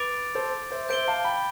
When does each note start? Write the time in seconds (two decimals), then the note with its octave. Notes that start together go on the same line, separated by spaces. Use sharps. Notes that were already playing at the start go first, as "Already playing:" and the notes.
Already playing: B4 D6 A6 D7 F7
0.35 A4 C5
0.71 C5 E5
0.89 C5 E5 G6 D7 G7
1.08 F5 A5
1.24 G5 B5